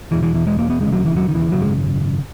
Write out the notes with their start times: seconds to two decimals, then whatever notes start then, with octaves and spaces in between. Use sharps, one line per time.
0.11 E1 E2 B2 E3
0.23 E3
0.35 E3
0.47 G#3
0.59 A#3
0.70 B3
0.81 E1 D#2 C#3 G#3
0.93 F#3
1.05 E3
1.16 F#3
1.29 D#3
1.35 E3
1.52 G#1 F#2 C#3 F#3
1.62 G#3